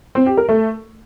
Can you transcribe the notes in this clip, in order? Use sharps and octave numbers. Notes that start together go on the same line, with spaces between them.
C4
G4
A#4
A3